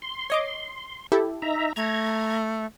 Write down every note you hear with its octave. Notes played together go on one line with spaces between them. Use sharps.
C6
C#5 D#5 D6
E4 G4 A4
D#4 E5 A#5
A3 A#5 G#6